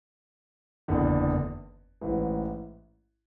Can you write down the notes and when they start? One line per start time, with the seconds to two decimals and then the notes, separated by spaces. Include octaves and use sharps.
0.88 F#1 E2 D3
2.01 A1 G#2 E3